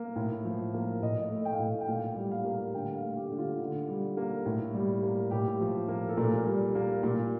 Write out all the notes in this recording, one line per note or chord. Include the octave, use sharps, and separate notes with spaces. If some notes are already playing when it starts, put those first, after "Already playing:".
Already playing: A#3
A2
F3
A#3
A2 D#5
A3
G5
F5
A2 G5
G5
A#2 F5
G3
F5
A#3
D3 G5
F5
A3
G4
D3
F4
D3
G3
A#3
A2
G3
A#3
A2 G4
F3
A#3
A4
A#2 A#4
G3
A#3
A#2